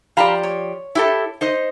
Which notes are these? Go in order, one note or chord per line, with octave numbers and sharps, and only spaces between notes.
F3 G4 D5 F5 A#5 B5
C#5
E4 G4 A4
D#4 C5 D#5